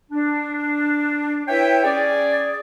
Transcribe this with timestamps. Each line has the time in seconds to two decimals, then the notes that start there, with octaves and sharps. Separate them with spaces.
0.11 D4
1.48 E4 B4 C#5 E5 G5
1.84 C#4 G#4 D5